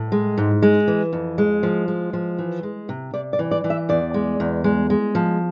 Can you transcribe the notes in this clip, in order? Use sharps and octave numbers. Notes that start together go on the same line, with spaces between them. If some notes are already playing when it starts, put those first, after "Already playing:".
Already playing: A2
G#3
G#2
G#3
E3
F2
G#3
F3
G#3
F3
E3
G#3
C3
C3 D5
D5
E3
D5
E3
E5
E2 D5
G#3
E2
G#3
G#3
F3